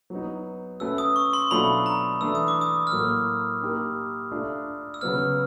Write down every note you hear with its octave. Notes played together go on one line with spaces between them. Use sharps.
F#3 B3 D#4
A3 C#4 F#4 B4 E6
D#6
C#6
C6
B2 F#3 A3 D4 F4 B5
A#5
E3 A3 D4 E6
D#6
D6
D#6
F6
A2 F#3 A#3 E6
A#3 D#4 G4 A#4
A3 D4 F4
E6
C#3 F#3 B3 F6